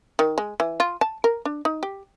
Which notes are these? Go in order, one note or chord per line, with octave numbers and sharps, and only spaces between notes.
D#3
G#3
E3
F4
A5
A#4
D4
D#4
G4